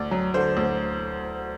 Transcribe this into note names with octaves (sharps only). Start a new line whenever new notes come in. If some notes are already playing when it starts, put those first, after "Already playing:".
Already playing: D2 D5
F#3
D3 C5
D2